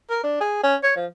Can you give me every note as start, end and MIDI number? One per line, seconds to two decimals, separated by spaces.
0.10 0.19 70
0.24 0.39 62
0.41 0.62 68
0.64 0.76 61
0.83 0.95 73
0.96 1.06 53